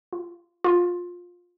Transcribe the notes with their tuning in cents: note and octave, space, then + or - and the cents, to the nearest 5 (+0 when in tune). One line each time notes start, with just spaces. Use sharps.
F4 -20
F4 +15